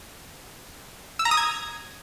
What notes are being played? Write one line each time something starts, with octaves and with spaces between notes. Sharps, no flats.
E6
A#5
D#6
G#6